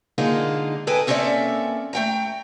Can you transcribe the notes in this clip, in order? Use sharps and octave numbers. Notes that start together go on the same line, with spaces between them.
D3 G#3 A#3 D#4 F4 G#4
A4 B4 D#5 G5 G#5
A#3 C4 C#4 A4 D5 E5
A3 G5 A#5